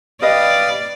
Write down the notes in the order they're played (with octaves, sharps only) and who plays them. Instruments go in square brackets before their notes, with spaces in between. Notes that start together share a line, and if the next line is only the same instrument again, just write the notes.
[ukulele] G4 D#5 [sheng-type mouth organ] B4 F5 D#6 [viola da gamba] D5